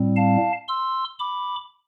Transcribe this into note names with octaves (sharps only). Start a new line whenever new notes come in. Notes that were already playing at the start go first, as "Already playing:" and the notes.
Already playing: A2 G3 C4
F5 A5
C6 E6
B5 D6